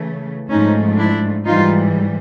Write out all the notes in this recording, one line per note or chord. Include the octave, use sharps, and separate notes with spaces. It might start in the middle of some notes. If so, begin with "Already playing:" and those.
Already playing: C#3 E3 A3
G#2 F3 A3 C#4 D#4
D4 E4
G#2 E3 G3 D#4 F4